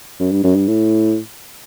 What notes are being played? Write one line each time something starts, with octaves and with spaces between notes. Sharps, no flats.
F#2
G2
F#2
G2
A2